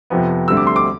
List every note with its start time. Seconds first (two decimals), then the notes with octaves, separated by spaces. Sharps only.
0.10 F2 C3 F3 B3
0.48 D2 D3 G3 C4 E6
0.57 D6
0.67 C6
0.76 D6